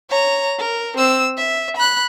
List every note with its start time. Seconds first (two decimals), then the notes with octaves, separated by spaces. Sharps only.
0.10 C#5 A#5
0.59 A#4
0.97 C4 E6
1.37 E5
1.76 B5 F#6